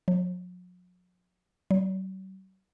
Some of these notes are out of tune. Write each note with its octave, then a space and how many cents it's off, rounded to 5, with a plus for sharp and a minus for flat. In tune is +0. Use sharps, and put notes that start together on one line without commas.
F#3 -45
F#3 +45